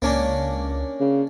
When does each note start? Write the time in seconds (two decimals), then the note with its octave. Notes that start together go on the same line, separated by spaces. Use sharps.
0.02 C#2 A#3 C#4 D4
1.00 C#3